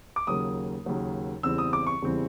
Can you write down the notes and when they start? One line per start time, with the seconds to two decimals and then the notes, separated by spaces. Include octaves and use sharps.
0.16 D6
0.27 D#2 C#3 F#3 A#3 D#6
0.85 D#2 C#3 F#3 A#3
1.43 E2 C#3 E3 G3 C4 E6
1.58 D#6
1.73 D6
1.87 C#6
2.02 E2 C#3 E3 G3 C4